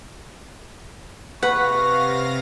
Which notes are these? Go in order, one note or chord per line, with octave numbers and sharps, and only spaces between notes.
C3 B4 F5 F#5 B5 C#6 A#6